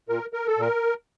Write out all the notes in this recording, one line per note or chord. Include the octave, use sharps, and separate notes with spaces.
A#2 A#4
A#4
A4
A#2 A#4